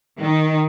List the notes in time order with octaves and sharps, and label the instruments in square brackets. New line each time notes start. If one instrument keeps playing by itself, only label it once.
[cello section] D#3